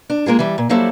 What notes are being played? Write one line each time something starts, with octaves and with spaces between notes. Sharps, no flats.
D4
G#3 A#3 F4 G#4
E3 G3
A#2
F#3 G3 A#3 E4 A4 C5